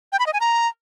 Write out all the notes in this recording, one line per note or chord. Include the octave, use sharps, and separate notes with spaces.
G5
B5
D#5
G#5
A#5